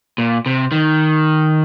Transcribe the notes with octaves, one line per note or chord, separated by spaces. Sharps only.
A#2
C3
D#3